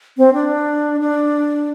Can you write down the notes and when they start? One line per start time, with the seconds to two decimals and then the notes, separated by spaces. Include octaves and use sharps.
0.18 C4
0.33 D4
1.01 D4